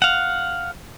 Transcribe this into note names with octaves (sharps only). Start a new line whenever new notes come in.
F5 F#5